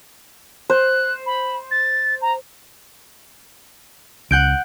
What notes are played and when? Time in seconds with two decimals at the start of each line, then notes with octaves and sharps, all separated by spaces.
0.70 C5 F#6
1.26 B5
1.71 A6
2.21 A#5
4.31 C#2 F#5 G6 D7